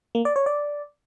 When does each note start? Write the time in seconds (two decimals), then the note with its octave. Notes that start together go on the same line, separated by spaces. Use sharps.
0.15 A#3
0.25 D5
0.36 C#5
0.46 D5